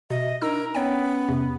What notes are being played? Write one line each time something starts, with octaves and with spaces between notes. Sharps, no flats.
B2 D#5 E5
D4 D#4 A#4 E6
B3 C#4 C#5 G5
E2 C3